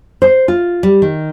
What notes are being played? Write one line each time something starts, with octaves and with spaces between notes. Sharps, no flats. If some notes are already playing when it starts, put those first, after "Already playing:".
C5
F4
G3
D#3